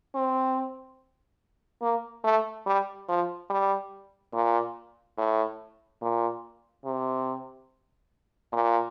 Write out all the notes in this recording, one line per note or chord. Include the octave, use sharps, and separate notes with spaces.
C4
A#3
A3
G3
F3
G3
A#2
A2
A#2
C3
A#2